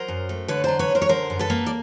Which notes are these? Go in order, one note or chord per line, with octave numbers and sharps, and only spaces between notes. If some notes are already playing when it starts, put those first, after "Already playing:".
Already playing: F#3 A#4 C5
F#2
A3
D3 B4 C#5
F#3 C5 D5
B4 C#5
F#2
A#4 C5
C#5
D3 A#4 C5
F#2
A4 B4
A#3
D5